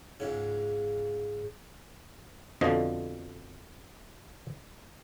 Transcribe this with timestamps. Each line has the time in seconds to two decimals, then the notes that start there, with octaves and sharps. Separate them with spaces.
0.20 C#2 G#2 C#3
2.61 F2 B2 D3 F3 D#5